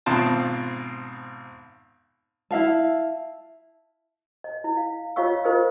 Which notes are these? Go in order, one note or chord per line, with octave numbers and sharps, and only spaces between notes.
G#1 B2 C4 F4 A5
E4 E5 F5 A5
D#5
E4
F5
F4 C#5 D#5 F5 C#6 E6
F4 A#4 C5 D#5 E6